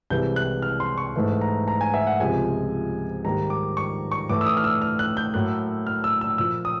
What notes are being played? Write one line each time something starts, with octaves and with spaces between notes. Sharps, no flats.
C2 C3 E3 G#3 G6
F#6
F6
C6
C#6
G#2 E3 A3
A#5
A#5
G#5
E5
F#5
C#2 C3 F3 G#3 G#5
G#2 D#3 G3 A#3 A#5
D6
C#6
C#6
A2 E3 A3 D6
E6
D#6
F6
E6
F6
F#6
G6
A2 F#3 A#3 F#6
F6
E6
E6
A#2 F3 A#3 E6
D#6